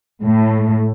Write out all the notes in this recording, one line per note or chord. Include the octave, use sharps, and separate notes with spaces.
A2